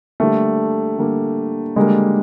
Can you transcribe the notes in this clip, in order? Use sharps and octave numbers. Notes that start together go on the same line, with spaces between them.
D3 G3 A3 A#3
D3 G3 A#3
D3 G3 G#3 A#3